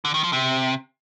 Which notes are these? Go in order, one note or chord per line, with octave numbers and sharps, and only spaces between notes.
D3
D#3
F3
C3